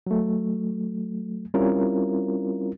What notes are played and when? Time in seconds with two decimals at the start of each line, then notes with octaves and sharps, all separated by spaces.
0.07 F#3 A3
1.54 G3 C4 C#4 E4 F4 A#4